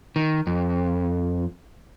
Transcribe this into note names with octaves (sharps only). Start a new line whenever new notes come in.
D#3
F2